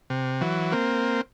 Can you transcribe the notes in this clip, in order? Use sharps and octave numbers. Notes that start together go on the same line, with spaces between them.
C3
E3 F#3
A#3 C4